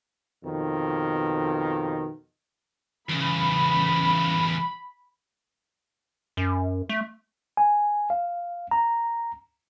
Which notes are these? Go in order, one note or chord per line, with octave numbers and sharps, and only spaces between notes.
F2 B2 D#3
E2 C#3 B5
F#2
A3
G#5
F5
A#5